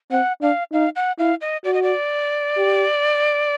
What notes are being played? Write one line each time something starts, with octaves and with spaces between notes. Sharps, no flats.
C4 F#5
D4 F5
D#4 F5
F#5
E4 F5
D#5
F#4 D5
D#5
D5
G4